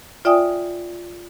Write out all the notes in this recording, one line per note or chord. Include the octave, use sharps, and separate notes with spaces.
F4 D5 E5 G5 G#5 D#6